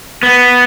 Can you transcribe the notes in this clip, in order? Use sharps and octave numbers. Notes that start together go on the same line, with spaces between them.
B3